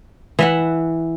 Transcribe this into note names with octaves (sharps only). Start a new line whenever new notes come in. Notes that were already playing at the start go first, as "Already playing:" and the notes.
E3 E5 F#5